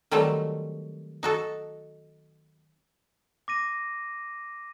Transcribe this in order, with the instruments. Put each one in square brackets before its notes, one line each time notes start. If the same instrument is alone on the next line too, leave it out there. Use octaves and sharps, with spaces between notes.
[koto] D#3 F#3 G3 A3 C4
D#4 F#4 A4
[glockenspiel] D6 A#6 D#7